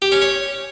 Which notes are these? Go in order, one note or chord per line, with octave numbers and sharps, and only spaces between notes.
G4
C#4
C#5